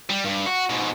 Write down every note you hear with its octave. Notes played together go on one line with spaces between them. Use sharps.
G3
G2
F#4
G#2 B2